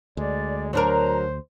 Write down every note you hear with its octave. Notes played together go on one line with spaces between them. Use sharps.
D2 G#3 D5
F#3 D4 A#4 C5 A#5